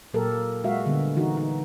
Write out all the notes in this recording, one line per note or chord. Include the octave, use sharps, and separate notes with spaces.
A#2 F#3 A#3 G4 A4 A#4
G#3 F#4 E5 F5
D3 G3 B3
E3 D#4 F#4
D#4